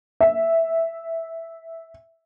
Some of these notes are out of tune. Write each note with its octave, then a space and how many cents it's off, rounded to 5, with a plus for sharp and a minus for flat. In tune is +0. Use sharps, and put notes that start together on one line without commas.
E5 -5